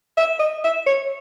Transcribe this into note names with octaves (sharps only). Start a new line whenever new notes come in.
E5
D#5
E5
C#5